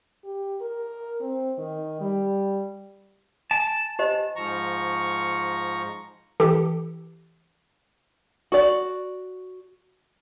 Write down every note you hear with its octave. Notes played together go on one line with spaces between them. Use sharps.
G4
A#4
C4
D#3
G3
G#5 A5
G4 C5 D#5
G#2 F3 A#5 C#6
E3 G4 A4
F#4 D5